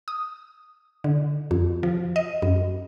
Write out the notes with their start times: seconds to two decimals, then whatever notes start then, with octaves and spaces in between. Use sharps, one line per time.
0.08 D#6
1.04 D3
1.51 F2
1.83 F3
2.16 D#5
2.42 F#2